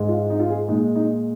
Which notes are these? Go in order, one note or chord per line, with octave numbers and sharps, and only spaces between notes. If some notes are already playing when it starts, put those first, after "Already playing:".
Already playing: G#2 G#3
F4
D#4
F4
G#4
A#2 G#3 D#4
D#4